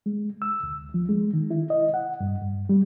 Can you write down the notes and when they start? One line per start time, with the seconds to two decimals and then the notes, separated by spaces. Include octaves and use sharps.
0.06 G#3
0.42 E6
0.63 D2
0.94 F3
1.09 G#3
1.34 D#3
1.51 E4
1.70 D#5
1.94 F#5
2.20 G2
2.42 G2
2.69 G3